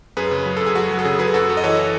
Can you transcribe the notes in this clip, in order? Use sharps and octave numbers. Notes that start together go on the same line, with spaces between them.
F#2 G#4 B4
C#3
F#3
F#2 A4
G#4
F#3 F#4
F#3
A4
C#3 G#4
F#3 G#4 B4
F#2 F#4 A4
F#2
D#5
E3 A4 C#5
E3